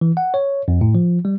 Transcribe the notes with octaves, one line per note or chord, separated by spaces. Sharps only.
E3
F#5
C#5
F2
A2
F3
G3